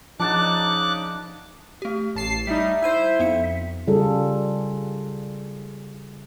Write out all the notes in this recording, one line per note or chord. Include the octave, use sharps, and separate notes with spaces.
C#3 F3 D4 D#4 F#5 A5 D6 F#6
A3 G4
A1 A5 C7
G3 D#4 E5
E4 C5 E6 D#7
F2 B3 D#4 C#7
C#3 G3 F4 G#4 A4